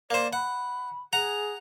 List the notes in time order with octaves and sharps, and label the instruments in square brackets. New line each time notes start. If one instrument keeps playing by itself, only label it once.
[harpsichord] A#3 C5 [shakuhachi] D5
[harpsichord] F#5 [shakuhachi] B5
[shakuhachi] G#4 [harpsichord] F#5 A#5